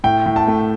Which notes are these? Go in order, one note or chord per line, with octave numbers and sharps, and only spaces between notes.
A2 G5
A2
A5
A3